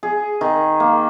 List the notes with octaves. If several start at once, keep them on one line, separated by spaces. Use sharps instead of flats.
G#4
D#3
A#3